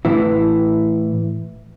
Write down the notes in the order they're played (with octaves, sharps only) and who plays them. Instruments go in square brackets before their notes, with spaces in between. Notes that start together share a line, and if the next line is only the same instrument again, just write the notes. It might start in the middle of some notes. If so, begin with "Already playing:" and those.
[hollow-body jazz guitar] A2 E3 E4